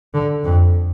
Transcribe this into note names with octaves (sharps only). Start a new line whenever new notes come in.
D3
F2